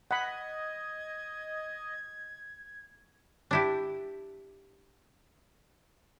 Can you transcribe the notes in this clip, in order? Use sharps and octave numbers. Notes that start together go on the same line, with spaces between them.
D#5 F#5 B5 G#6
D4 E4 G4